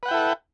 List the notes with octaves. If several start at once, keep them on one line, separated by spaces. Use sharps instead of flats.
E4 A4 B4 F#5 G5